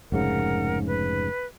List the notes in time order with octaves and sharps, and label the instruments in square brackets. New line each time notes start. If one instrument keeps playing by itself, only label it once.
[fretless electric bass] F1 G#2 C#3 [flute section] A#4 F#5
[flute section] B4